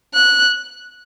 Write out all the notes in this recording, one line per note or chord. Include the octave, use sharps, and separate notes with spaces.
F#6